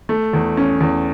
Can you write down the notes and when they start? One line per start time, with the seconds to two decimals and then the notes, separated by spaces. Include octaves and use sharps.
0.09 A3
0.33 E2
0.57 C#4
0.80 E2